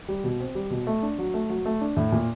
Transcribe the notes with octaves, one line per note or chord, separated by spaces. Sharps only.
G3
B2
C4
G3
B2
A3
D4
F#3
A3
F#3
A3
D4
A2
A#2